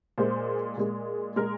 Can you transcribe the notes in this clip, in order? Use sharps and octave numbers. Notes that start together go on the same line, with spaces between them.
A#2 G#3 C5
A#2 G#3
A#2 G#3 A#4